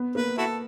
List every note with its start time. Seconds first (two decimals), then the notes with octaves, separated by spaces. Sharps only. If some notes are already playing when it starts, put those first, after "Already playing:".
Already playing: B3
0.15 A#3 B4
0.38 E4 F#4 A4